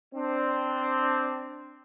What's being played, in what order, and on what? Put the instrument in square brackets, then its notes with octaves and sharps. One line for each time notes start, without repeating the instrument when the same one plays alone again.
[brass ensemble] C4 D4